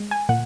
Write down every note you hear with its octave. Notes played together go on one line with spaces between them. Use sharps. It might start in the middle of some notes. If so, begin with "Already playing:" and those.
Already playing: G#3
G#5
A#2 F#5